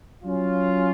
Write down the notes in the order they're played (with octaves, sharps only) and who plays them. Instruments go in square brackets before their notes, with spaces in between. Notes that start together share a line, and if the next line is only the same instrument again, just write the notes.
[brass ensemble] F#3 C#4 F4